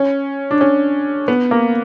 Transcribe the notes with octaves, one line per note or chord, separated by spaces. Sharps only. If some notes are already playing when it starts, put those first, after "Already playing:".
Already playing: C#4
D4
C#4
B3
A#3